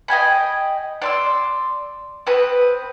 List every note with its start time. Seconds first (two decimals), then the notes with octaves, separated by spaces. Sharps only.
0.08 D#5 G5 G#5 B5
1.02 D5 C6 E6
2.27 C4 B4 D#6